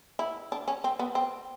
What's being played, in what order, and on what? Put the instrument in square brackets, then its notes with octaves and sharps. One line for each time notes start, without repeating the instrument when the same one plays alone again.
[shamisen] E4
D4
C#4
C4
B3
C4